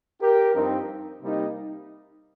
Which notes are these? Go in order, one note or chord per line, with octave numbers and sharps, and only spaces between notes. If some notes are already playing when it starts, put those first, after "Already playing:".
G4 A#4
G2 F3 C4 D#4
C3 G3 A#3 D#4